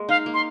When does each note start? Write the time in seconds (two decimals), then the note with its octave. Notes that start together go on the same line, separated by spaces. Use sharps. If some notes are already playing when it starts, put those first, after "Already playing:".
Already playing: G#3 A#3
0.09 D#4 F5
0.26 A#3
0.34 C6